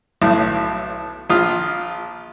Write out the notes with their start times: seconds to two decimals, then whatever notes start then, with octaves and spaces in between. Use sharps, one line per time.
0.22 B1 A2
1.30 A#1 F4 D#6